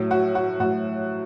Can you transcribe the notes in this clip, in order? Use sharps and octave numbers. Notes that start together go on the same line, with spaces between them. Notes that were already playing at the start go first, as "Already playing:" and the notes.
Already playing: A2 F#3
F#4
F#4
A2 F#3 F#4